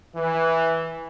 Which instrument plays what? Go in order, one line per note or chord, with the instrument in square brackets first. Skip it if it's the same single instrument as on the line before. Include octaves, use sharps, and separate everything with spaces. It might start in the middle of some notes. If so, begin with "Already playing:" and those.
[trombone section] E3